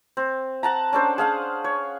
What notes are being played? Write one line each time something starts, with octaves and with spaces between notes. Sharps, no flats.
C4
F#5 A5 A#5
C#4 D4 A4 C5
G#4 F5 F#5
C#5